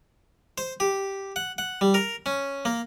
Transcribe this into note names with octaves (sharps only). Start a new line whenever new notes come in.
C5
G4
F#5
F#5
G3
A#4
C#4
A#3